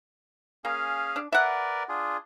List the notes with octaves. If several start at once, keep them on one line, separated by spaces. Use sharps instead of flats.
A#3 C#4 G#4 F5
D4
A#4 B4 D5 E5 F#5
D4 F4 G#4